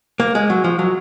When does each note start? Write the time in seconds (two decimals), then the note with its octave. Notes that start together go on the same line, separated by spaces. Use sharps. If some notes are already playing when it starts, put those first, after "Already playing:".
0.20 A#3
0.35 G#3
0.50 F#3
0.64 F3
0.79 F#3